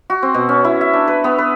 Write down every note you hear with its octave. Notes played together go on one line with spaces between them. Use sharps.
F#4
C4
B2
C#4
E4
E5
D4
B4
B3
B4